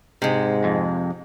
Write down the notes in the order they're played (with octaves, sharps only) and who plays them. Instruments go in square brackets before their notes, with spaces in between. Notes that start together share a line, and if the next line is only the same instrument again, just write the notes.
[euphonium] G#2 [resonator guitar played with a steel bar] C3 G#3
[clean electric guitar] F2